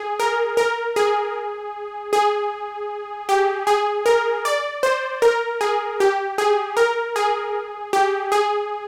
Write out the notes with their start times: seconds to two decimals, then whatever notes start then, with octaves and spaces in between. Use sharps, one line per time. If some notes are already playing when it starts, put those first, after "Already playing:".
Already playing: G#4
0.20 A#4
0.57 A#4
0.96 G#4
2.13 G#4
3.29 G4
3.67 G#4
4.06 A#4
4.45 D5
4.83 C5
5.22 A#4
5.61 G#4
6.00 G4
6.38 G#4
6.77 A#4
7.16 G#4
7.93 G4
8.32 G#4